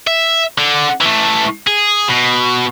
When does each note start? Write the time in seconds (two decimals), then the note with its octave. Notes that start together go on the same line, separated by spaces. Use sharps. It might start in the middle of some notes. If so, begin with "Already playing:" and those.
0.07 E5
0.58 D3
1.01 E3 A3
1.67 G#4
2.08 B2